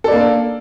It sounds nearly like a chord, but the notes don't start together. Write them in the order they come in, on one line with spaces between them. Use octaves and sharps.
A4 D5 A#3 D4